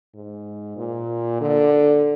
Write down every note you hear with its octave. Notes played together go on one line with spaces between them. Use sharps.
G#2
A#2
D3